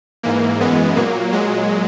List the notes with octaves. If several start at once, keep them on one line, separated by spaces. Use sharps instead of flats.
G#2 E3 A#3
F#2 E3 G#3 B3
A#2 F#3 A#3
A#2 F#3 G#3